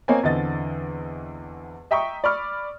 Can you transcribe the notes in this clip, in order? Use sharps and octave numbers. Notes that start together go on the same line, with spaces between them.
A#3 C4 C#5 D#5 G#5
E2 D3 C4 D#5 A6
D#5 E5 G5 A#5 C#6 D#6
D5 B5 C#6 D6 F6